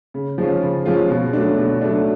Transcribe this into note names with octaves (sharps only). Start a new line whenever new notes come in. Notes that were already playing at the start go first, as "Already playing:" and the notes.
C#3
F3 G#3 C#4 F4
C#3
F3 G#3 C#4 F4
B2
F#3 A3 D4
B2
F#3 A3 D4